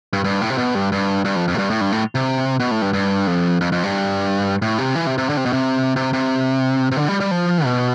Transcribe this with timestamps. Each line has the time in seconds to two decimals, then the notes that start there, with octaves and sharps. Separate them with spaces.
0.13 G2
0.24 G2
0.41 A2
0.50 C3
0.58 B2
0.75 G2
0.92 G2
1.25 G2
1.36 F2
1.48 F2
1.54 A2
1.58 G2
1.70 A2
1.81 G2
1.92 A2
2.15 C3
2.60 B2
2.71 A2
2.82 G2
2.93 G2
3.27 F2
3.61 F2
3.72 F2
3.84 G2
4.62 A2
4.78 C3
4.95 E3
5.06 C3
5.18 C3
5.29 D3
5.37 C3
5.45 B2
5.53 C3
5.96 C3
6.13 C3
6.92 C3
6.97 D3
7.08 G3
7.20 G3
7.31 F3
7.65 B2